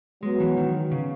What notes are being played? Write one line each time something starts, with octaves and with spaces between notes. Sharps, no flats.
F#3 G#3 B3 F#4
E3
D#3
C#3